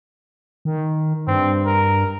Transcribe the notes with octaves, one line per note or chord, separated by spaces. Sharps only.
D#3
G2 C4
A#4